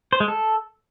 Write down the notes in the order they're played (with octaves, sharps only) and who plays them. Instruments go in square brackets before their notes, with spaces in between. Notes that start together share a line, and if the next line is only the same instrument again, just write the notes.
[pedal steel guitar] C5
G#3
A4